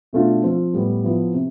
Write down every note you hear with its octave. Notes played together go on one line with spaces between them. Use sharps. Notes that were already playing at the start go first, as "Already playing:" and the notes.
B2 A3 D4 F4
F3 C4 F4
A2 G3 B3
F3 B3 E4
C3